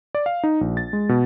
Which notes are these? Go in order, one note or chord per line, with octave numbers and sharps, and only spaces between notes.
D5
F5
D#4
A#1
A6
G#3
B2